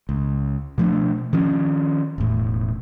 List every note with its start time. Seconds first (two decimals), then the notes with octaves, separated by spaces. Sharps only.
0.09 C#2
0.78 B2 F3 A3 D4
1.33 D#3 F3 C#4
2.18 E1 A2